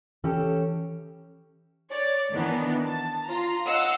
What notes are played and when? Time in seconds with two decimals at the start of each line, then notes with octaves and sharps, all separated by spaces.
0.24 E3 C#4 G4 A4
1.91 C#5 D5
2.32 D#3 E3 B3 D4
2.85 A5
3.25 F4 A#5
3.66 D#5 F5 F#5 E6